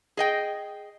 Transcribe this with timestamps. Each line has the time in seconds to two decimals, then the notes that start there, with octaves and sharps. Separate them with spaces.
0.17 G#4 D#5 G5